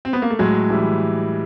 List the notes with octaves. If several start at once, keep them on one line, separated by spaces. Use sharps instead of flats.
C4
B3
A#3
A3
A2 F#3 G#3
E3 G3